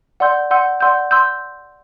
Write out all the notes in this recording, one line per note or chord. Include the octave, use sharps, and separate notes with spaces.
D5 F#5 C6 E6 G6
D5 F#5 C6 E6 G6
D5 F#5 C6 E6 G6
C6 E6 G6